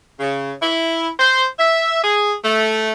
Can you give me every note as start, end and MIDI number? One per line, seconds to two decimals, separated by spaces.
0.20 0.53 49
0.62 1.08 64
1.19 1.45 72
1.59 1.98 76
2.02 2.33 68
2.44 2.92 57